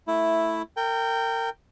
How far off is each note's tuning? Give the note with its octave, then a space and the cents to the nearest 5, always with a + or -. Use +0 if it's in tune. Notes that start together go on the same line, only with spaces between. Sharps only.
A3 +0 E4 +0
A#4 -30 G5 +0